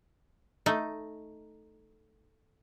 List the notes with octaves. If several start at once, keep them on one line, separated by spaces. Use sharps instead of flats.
A3 D#4